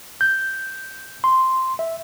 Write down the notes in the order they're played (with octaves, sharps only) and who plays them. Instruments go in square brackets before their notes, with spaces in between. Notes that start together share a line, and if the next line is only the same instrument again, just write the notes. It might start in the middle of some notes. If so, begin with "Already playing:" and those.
[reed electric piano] G6
C6
E5